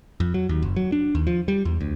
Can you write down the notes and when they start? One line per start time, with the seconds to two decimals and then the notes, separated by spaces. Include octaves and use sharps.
0.20 F2
0.34 F#3
0.49 D#2
0.62 F#1
0.76 F#3
0.92 D4
1.15 D#2
1.27 F3
1.48 G3
1.65 E2
1.81 D2